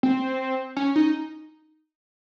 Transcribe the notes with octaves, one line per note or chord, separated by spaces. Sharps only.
C4
C#4
D#4